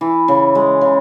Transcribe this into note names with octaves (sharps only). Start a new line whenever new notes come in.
E3
C#3
G#3
C#3